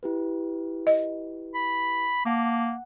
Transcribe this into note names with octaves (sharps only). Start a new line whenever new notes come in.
E4 G4 B4
D#5
B5
A#3 F#5 A5 D6
F#5